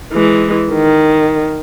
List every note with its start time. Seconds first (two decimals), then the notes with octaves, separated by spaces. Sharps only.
0.13 E3 G#3
0.73 D#3